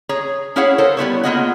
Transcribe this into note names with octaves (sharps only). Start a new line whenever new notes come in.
G#4 C#5 A#5
C#4 E4 G#4 C#5 F5 F#5
A4 A#4 C5
G3 B3 E4 C#5
A#3 B3 F4 G#4 D#5 F#5